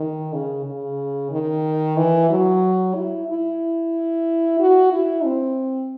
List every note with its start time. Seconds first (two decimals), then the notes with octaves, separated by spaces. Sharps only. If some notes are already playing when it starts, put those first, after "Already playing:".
Already playing: D#3
0.33 C#3
0.65 C#3
1.31 D#3
1.97 E3
2.30 F#3
2.96 E4
3.28 E4
4.60 F#4
4.92 E4
5.25 C4